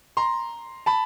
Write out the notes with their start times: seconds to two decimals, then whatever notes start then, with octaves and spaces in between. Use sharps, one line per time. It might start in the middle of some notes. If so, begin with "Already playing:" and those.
0.17 A#5 C6
0.86 A5 B5